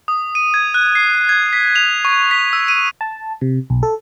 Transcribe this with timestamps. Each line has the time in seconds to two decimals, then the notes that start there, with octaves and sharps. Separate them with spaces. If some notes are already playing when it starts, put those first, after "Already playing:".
0.08 D#6
0.35 D#7
0.54 G#6
0.74 F#6
0.95 C7
1.29 G#6
1.53 B6
1.76 F7
2.05 C#6
2.31 B6
2.53 E6
2.68 D#7
3.01 A5
3.41 C3
3.70 B1
3.83 A4